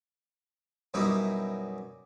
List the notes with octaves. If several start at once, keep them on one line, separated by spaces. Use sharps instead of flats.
F#2 B2 G3 C#4 D#4 E4